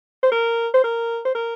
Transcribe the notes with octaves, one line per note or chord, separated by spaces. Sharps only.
C5
A#4
C5
A#4
C5
A#4